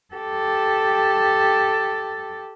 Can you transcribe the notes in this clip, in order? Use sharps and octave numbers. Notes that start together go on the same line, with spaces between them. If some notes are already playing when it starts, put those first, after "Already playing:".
G4 A4